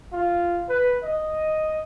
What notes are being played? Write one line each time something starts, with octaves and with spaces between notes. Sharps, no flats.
F4
B4
D#5